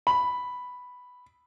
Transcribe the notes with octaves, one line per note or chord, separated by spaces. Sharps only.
B5